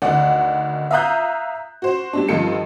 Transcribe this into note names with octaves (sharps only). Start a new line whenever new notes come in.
D2 D#3 D5 F#5
E5 F5 A#5 D#6 F#6 G6
F#4 C5
G3 C4 D4
G2 D#3 F3 F4 A4 C#7